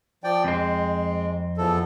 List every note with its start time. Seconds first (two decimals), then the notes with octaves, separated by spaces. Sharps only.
0.24 F3 D5 G5
0.44 F2 G#3 C4
1.58 E2 F3 A4